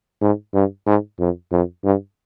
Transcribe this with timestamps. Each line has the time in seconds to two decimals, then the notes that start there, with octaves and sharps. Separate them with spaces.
0.22 G#2
0.54 G2
0.87 G#2
1.20 F2
1.52 F2
1.84 G2